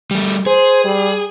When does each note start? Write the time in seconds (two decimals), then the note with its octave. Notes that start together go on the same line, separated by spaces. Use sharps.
0.11 G3 A3
0.46 G#4 C5
0.85 G3